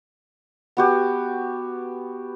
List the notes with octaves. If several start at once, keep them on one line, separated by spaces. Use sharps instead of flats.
B3 F#4 G4